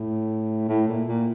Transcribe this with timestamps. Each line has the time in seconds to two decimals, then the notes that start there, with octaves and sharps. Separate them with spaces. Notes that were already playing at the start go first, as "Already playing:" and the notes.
Already playing: A2
0.69 A2
0.88 A#2
1.08 A#2